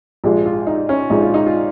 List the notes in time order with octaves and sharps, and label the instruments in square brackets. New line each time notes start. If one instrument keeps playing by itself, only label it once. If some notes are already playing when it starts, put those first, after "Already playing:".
[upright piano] A#1 G#2 F3 G#3 G4
F4
D#4
C#4
A#1 G#2 F3 G#3 D#4
F4
D#4
F4